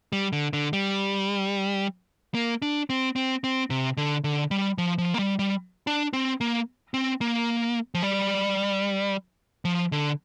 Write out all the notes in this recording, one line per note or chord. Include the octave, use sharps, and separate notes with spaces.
G3
D3
D3
G3
A#3
D4
C4
C4
C4
C3
D3
D3
G3
F3
F3
A#3
G3
G3
D4
C4
A#3
C4
A#3
F3
G3
F3
D3